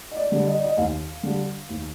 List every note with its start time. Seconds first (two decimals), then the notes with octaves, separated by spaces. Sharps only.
0.11 D#5
0.17 D5
0.32 D3 G3
0.47 D#5
0.56 D5
0.64 D#5
0.77 D#2 F5
1.23 D3 G3
1.69 D#2